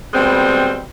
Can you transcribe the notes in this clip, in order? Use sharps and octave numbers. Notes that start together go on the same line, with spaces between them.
B2 G3 G#3 C4